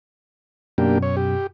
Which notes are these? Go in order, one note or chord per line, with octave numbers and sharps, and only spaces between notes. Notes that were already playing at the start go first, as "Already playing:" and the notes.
F#2 B2 A#3 D4 G4
C#5
G4